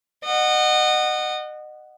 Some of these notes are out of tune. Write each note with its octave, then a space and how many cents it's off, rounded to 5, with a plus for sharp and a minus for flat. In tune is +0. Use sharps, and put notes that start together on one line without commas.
D#5 -30 F#5 +0